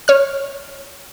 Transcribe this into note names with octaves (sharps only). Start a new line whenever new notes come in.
C#5 F6